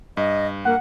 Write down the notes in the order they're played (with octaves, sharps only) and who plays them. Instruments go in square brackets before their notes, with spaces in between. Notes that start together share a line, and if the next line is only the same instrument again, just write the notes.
[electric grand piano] G2 [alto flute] D#5
[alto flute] A#3 [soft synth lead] F#5